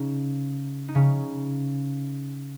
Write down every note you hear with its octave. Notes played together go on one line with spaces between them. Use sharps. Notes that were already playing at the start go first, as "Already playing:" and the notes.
Already playing: C#3 C#4 D#4
D#4
C#3 C#4